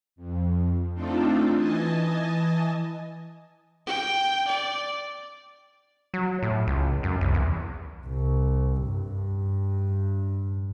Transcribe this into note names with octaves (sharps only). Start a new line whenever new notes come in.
F2
A3 C4 D4 D#4 F4 A4
E3 D#5 G#5 A5
G5
D5
F#3
A2
C#2
F#2
C2
E2
C2
G2